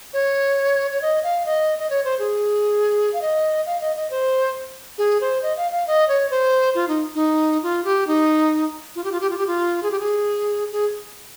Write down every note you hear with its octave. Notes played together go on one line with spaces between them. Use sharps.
C#5
C#5
D#5
F5
D#5
D#5
C#5
C5
G#4
F5
D#5
F5
D#5
D#5
C5
G#4
C5
D#5
F5
F5
D#5
C#5
C5
F4
D#4
D#4
F4
G4
D#4
F4
G4
F4
G4
F4
G4
F4
G#4
G4
G#4
G#4